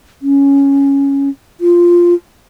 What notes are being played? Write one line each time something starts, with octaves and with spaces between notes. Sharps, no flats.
C#4
F4